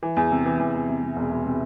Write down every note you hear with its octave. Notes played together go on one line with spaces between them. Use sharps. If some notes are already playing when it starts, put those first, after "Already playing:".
E3
E2
C3
E3
E2
E2
C3
C3
E1
E1
C3